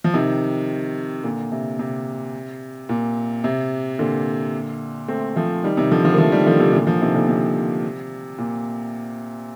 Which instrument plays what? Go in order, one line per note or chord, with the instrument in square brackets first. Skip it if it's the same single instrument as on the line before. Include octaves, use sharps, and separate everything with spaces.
[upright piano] F3
C3 D#3
A#2 D3
C3
C3
A#2
C3
A#2 D3
A3 C4
F3 A3
D#3 G3
C3 D#3
D3 F3
D3 F3
A#3
F3 A3
D#3 G3
D3 F3
C3
A#2 D3
D3 F3
C3 D#3
A#2 D3
C3
A#2